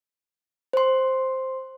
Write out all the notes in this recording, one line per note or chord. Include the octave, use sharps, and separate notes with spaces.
C5 C6